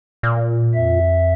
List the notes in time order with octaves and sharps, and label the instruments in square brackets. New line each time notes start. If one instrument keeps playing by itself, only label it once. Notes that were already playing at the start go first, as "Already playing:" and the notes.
[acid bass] A#2
[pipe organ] F2 E5